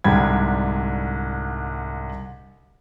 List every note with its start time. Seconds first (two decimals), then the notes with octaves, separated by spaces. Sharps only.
0.04 C2 G#2 D3 G5 B5 G#6